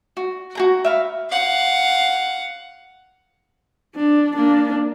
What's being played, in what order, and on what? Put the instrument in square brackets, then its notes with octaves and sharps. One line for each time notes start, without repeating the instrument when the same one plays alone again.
[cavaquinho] F#4
F#4 G#4 A#5
E5 F5 B5
[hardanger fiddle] F5 F#5
[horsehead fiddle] D4
A#3 D4